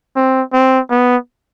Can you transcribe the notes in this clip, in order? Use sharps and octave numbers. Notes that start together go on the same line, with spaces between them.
C4
C4
B3